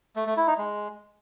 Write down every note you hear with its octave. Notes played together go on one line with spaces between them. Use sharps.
A3
A3
E4
D#4
G#3